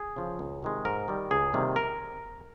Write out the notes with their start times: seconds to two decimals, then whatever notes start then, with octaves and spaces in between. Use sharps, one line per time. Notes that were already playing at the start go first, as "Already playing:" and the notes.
Already playing: G#4
0.16 C#3 F3
0.39 C#2
0.63 C3 D#3 G#3
0.85 G#2 A#4
1.08 D#3 G3
1.31 C#2 G#4
1.53 C3 D#3 G3 A#3
1.76 A#4